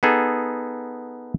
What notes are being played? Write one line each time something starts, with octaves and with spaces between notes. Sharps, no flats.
B3 D#4 G#4 A4